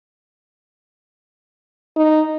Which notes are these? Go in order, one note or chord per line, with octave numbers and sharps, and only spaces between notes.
D#4